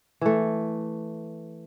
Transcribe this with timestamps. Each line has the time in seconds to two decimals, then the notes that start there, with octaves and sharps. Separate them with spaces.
0.21 E3 A3